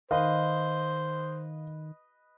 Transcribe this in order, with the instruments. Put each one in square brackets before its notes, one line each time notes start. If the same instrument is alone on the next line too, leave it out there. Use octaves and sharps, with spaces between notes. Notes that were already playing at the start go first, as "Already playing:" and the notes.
[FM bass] D#3 [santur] B4 D#5 [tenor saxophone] C5 [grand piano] F5